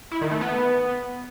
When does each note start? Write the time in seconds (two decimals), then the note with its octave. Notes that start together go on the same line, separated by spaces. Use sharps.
0.12 E4
0.21 D#3
0.31 A3
0.41 B3